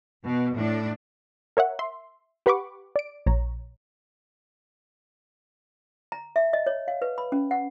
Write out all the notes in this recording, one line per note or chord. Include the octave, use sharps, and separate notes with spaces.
B2
A2 D4
A#4 C#5 E5 F#5
E5 C6
G4 B4 F#5 B5 C#6 D6
D5 D7
A#1 C#5 A#5
A#5
E5
D#5
C#5
F5
B4
B5
C#4
F#5